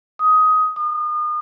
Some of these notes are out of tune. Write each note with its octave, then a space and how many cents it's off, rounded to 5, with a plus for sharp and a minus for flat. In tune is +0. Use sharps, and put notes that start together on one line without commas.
D#6 +15
D#6 -35